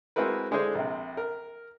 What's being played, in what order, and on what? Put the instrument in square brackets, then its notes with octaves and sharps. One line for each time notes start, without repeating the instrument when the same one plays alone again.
[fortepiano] G#3 C4 E4 F#4 A#4 B4
D3 G#3 D4 E4 G#4 C5
A#1 C3
A#4